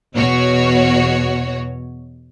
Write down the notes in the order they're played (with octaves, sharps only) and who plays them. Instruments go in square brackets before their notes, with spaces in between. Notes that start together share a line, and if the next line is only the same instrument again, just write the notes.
[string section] E2 B2 F#4 C#5